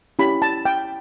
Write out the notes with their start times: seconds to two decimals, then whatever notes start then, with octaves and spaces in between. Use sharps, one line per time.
0.19 C#4 E4 G4 B5
0.42 A5
0.65 G5